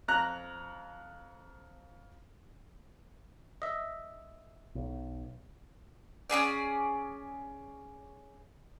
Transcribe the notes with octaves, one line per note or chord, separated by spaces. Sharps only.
F2 A#5 F#6
D#5 E5
B1
C#4 E4 G#4 D5